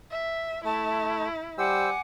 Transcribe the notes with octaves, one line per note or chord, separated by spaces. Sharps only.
E5
A3 E4 A5
G3 C5 F#5 G#5 D6 E6